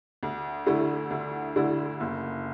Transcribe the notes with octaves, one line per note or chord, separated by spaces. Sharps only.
D2
D3 A3 E4
D2
D3 A3 E4
F#1